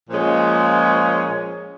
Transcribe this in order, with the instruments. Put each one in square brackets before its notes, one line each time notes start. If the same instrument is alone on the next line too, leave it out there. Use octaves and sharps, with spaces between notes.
[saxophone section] A#2 F3 G#3 C#4